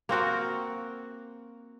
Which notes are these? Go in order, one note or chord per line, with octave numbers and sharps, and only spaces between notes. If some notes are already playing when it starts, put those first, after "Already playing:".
A#3 C4 F#4 A#4